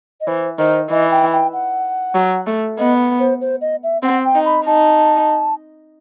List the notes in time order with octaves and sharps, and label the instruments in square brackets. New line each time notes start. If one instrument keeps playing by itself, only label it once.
[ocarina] D#5
[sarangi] E3 [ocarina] C5
[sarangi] D#3 [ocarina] C5
[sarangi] E3 [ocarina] D#5
[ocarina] G5
G5
F#5
[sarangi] F#3
A3
[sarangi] B3 [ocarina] D#5
[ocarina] C5
C5
D#5
E5
[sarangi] C4 [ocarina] F#5
[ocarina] G5
[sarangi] D#4
[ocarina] B5
[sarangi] D#4 [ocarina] A5